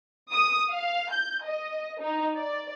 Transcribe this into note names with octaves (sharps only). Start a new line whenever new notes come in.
D#6
F5
G6
D#5
D#4
D5